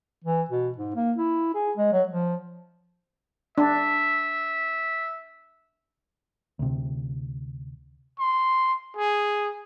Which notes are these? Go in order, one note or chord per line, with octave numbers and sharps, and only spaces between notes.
E3
B2
G#2
A#3
E4
G#4
G#3
F#3
F3
D4 E5
D2 C3
C6
G#4